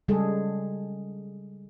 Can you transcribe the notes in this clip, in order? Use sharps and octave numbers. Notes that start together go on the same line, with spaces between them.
C#3 G3 G#3 G#4 A4